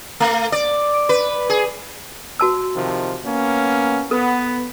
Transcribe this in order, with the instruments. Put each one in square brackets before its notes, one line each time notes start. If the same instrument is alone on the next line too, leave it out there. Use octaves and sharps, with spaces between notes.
[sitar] A3
D5
B4
G#4
[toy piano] F#4 A5 E6
[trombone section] C3 D#3 F3
A#3 B3 C#4
[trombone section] B3 [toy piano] A4